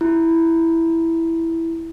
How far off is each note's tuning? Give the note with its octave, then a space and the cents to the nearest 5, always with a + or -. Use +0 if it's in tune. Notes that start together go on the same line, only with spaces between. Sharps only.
E4 +0